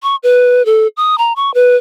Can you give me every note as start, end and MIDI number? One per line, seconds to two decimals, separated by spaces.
0.03 0.16 85
0.23 0.65 71
0.66 0.87 69
0.97 1.18 87
1.18 1.33 82
1.36 1.53 85
1.54 1.77 71